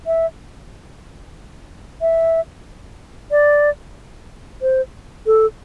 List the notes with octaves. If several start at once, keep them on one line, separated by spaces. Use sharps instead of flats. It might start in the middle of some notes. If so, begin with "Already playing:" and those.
E5
E5
D5
C5
A4